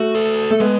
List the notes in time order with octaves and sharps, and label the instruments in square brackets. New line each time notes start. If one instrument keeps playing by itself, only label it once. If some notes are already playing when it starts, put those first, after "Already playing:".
Already playing: [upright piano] A3 [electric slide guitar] F#4
[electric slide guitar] A4
[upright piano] A3
[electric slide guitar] G#3 [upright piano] B3